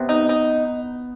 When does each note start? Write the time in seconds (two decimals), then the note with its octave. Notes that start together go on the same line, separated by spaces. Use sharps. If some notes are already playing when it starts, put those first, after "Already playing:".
Already playing: C3 B3
0.09 D#4
0.29 D#4